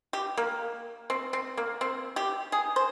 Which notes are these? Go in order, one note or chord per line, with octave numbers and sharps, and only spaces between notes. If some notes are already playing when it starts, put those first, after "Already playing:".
G4
A#3
C4
C4
A#3
C4
G4
G#4
C5